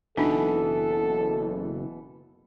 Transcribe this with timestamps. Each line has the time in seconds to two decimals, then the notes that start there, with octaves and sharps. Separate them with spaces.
0.17 F#1 B2 E3 D4 D#4 A4